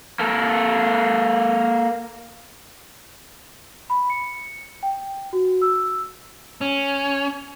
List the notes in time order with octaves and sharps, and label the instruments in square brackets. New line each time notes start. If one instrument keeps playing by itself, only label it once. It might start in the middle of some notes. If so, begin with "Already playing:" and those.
[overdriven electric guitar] A#3 A4
[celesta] B5
C#7
G5
F#4
E6
[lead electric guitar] C#4